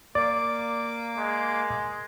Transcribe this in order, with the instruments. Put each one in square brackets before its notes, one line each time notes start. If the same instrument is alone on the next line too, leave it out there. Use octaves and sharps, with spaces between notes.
[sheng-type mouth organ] A#3 D6 [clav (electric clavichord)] D5
[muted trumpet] G#3